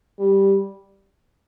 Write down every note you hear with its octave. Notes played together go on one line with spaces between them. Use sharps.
G3